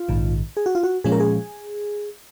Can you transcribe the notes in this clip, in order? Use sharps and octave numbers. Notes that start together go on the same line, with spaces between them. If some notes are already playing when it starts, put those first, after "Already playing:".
Already playing: F4
A#1 G#2 D#3
G#4
F#4
F4
F#4
A#2 F3 G#3 C#4 G#4
A#4
G#4